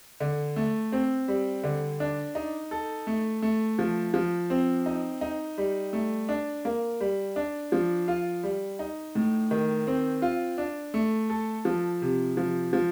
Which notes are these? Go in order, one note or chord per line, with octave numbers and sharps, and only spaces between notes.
D3
A3
C4
G3
D3
D4
D#4
A4
A3
A3
F3
F3
C4
D#4
D#4
G3
A3
D4
A#3
G3
D4
F3
F4
G3
D#4
A2
D#3
C4
F4
D4
A3
A4
F3
C3
F3
F3